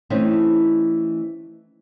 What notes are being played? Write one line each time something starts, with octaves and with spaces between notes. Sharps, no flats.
E3 A3 C4 C#4 D#4